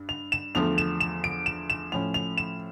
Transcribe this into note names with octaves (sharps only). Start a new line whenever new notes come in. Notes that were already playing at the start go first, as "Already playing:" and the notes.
Already playing: G2
F7
E7
E2 D3 F3 A3 F7
E7
E7
D7
E7
E7
A2 F3 C#4 F7
F7
E7